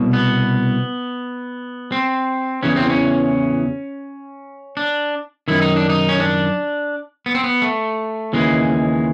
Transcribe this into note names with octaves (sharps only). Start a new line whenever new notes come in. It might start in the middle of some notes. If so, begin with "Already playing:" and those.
Already playing: C2 B2
B3
C4
E2 C#3 E3 C#4
C4
C#4
D4
F#2 D#3 E4
D#4
D4
D#4
C#4
D4
B3
C4
B3
A3
D#2 C#3 E3 G#3